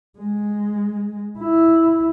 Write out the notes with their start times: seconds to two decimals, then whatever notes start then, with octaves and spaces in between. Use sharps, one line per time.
0.19 G#3
1.39 E4